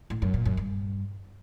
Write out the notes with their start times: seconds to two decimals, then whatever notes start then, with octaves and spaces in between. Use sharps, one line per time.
0.10 A2
0.22 F#2
0.34 A#2
0.46 F#2
0.57 G2